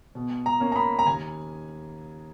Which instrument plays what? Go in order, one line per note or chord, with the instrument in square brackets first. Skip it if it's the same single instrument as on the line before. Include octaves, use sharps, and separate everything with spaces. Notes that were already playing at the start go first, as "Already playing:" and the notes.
[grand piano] B2
A#5
A#3 C#4
A#5
B5
A#5
D#2 G#5